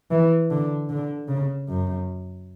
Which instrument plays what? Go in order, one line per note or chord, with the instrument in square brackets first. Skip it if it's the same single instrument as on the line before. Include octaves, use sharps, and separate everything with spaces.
[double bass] E3
D3
D3
C#3
F#2